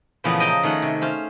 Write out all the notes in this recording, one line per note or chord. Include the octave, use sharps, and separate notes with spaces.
A#2 C#3 E3 F3 A3 B3
D#5 G5 A5 A#5
D#3 A3 C#4 G#4 F#5
C3
C#4 C5 F5